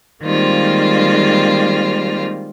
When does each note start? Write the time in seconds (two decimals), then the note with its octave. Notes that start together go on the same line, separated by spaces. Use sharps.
0.22 D#3 G3 G#3 A#3 C4 F4